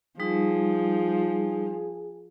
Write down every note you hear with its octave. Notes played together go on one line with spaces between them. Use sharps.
F3 G3 D#4 G#4